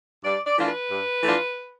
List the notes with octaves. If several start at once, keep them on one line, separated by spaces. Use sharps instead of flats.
G2 D5
D5
E3 A3 D4 F4
B4
G2
E3 A3 D4 F4